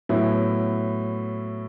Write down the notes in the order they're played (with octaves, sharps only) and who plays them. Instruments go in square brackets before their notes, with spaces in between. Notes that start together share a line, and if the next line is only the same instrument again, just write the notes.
[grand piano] A2 F#3 B3 E4